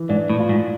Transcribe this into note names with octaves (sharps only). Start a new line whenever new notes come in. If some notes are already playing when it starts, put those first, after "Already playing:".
Already playing: E3
G#2 D4
A2
F4
G#2